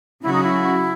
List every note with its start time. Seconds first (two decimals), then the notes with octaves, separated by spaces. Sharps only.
0.22 C#3 F#3 C#4 E4 F#4
0.33 D#4
0.43 E4